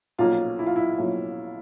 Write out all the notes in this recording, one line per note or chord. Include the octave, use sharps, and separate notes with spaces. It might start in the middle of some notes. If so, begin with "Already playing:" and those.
B1 A#2 F3 A#3 C#4 F4
E4
F4
E4
B1 A#2 F3 A#3 C#4